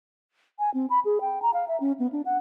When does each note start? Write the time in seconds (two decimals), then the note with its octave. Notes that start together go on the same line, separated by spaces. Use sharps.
0.59 G#5
0.74 C4
0.90 B5
1.05 G#4
1.21 G5
1.42 A#5
1.54 F5
1.68 E5
1.80 C#4
1.99 B3
2.12 D4
2.26 F#5